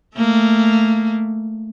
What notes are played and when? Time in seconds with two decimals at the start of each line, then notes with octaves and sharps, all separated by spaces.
0.16 A3 A#3